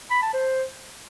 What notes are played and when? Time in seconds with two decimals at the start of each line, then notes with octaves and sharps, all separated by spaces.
0.11 B5
0.22 A5
0.33 C5